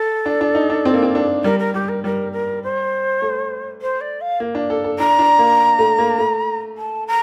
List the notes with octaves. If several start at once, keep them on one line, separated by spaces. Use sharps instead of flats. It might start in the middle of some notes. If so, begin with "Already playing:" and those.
Already playing: A4
D4
D4
D#4
D4
C4
A#3
C4
D4
G3 A#4
A#4
G3 G4
A#4
G3 A#4
A#4
C5
A3
C5
D5
F5
A#3
D4
A4
A4
D4 A#5
D4
A#3
A3
A#3
A3
A5
A#5